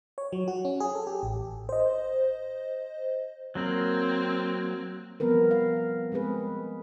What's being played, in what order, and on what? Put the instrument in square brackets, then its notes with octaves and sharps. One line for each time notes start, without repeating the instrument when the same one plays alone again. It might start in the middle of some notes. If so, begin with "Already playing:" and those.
[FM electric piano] C#5
F#3
F#4
C#4
G#4
A4
G4
A1
C5 D#5
[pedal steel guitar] F#3 A#3 [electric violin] C4
[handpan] F3 G3 B3 C4 A#4 B4
F5
G#3 C4 G#4 B4